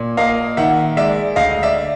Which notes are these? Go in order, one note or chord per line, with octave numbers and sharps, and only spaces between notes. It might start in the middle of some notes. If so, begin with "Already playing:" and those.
Already playing: A#2
A#3 D#5 F5
D#3 E5 F#5
G#3 D5 E5
D2 D#5 F5
D5 E5